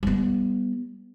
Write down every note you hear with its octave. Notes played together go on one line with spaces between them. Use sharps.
G3 B3